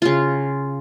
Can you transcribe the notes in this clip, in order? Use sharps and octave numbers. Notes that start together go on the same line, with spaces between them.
C#3 F4